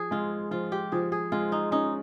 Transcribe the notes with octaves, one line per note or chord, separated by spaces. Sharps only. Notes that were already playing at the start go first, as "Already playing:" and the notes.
Already playing: F3 G#4
G#3 F4
F3 F4
G4
F3 G#4
G#4
G#3 F4
D#4
C#4 D#4